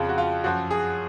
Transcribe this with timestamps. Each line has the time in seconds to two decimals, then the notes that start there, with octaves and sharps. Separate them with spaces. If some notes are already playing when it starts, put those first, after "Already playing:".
Already playing: F2 C#3 F3 F4
0.09 F#4
0.18 F4
0.44 F#2 F3 F#4
0.71 G#4